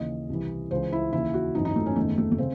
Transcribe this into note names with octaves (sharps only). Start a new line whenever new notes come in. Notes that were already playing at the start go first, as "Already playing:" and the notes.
Already playing: D#2 C#3 E3 D#5
C2 C3 E3
C#2 C#3 E3 C5
E4
D#2 C#3 E3 E4
F#4
G#1 F#2 E3 D#4
D#4
A3
C#4
F#1 E2 D#3 A3
A3
A3
C#3 C4